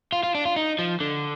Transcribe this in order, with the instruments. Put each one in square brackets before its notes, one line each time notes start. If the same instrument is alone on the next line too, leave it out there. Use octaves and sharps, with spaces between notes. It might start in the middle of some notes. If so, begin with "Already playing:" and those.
[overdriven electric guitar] F4
F4
D4
F4
D#4
F3
D3